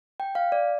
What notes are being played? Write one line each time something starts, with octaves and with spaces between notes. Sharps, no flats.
G5
F5
D5